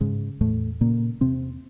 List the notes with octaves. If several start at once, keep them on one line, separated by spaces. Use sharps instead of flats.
G#2 C#3 G#3
E2 A2 A3
A#2 C#3 A#3
E2 C3 C4